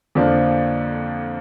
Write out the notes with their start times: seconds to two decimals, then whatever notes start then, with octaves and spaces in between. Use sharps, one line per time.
0.15 F2 D3 F3 A#3 D4